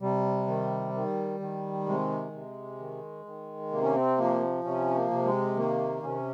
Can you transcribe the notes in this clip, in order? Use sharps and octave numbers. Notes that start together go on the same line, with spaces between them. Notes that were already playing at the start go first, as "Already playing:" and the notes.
C3 G3
D#3
D#3
D#3
C3 G#3
C3
D#3
D#3
C3 A#3
C#4
C4
F3 A#3
C3 C#4
A#3
C3
G#3
D#3 A#3
C3 C#4